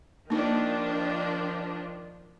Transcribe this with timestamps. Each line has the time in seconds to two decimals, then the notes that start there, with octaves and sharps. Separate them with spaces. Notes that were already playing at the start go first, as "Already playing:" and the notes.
0.30 D#3 F3 A#3 D4 D#4